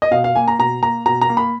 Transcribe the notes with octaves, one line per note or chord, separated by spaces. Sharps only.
D#5
B2 F5
F5
A#3 G#5
A#5
B2 A#5
A#3 A#5
B2 A#5
A#5
A#3
B5